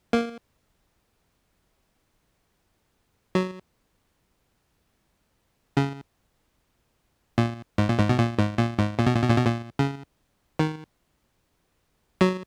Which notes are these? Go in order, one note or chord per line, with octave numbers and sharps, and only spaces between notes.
A#3
F#3
C#3
A#2
G#2
A#2
G#2
B2
A#2
G#2
A#2
G#2
A#2
B2
A#2
B2
A#2
B2
A#2
C#3
D#3
F#3